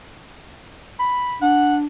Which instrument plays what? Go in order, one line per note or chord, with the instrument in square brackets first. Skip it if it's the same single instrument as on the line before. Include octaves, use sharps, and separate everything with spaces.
[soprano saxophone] B5
[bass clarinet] D4 [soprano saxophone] F#5